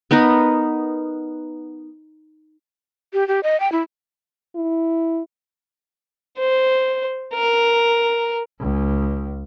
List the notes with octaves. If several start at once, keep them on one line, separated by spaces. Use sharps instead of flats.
B3 D#4 A#4 B4
G4
G4
D#5
G5
E4
E4
C5
A#4
C#2